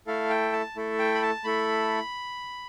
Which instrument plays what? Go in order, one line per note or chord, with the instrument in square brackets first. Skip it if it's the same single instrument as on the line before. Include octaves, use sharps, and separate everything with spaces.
[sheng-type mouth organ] A3 E4 A4 F5
G5
A5
A3 E4 A4
G5
B5
A5
A3 E4 A4 B5